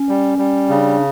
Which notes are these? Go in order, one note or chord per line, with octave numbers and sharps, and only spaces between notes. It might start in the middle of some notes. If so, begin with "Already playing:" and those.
Already playing: C#4
G3
G3
C#3 D4